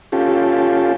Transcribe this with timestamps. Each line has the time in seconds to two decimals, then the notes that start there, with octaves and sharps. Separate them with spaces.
0.12 C#4 F4 G4 A4